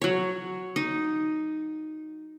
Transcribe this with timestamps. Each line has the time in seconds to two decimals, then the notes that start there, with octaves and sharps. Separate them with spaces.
0.02 F#3 C#5
0.76 D#4